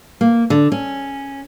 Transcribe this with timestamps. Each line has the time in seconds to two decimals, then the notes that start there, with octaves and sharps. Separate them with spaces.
0.21 A#3
0.50 D3
0.72 C#4